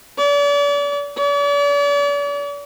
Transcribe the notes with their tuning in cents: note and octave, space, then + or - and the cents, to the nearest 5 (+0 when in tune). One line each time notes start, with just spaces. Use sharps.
D5 -40
D5 -45